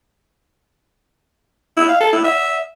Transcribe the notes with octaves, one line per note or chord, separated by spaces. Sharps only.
E4
F5
A4
E4
E5